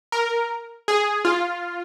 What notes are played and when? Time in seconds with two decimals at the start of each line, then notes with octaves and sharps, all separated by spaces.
0.12 A#4
0.88 G#4
1.25 F4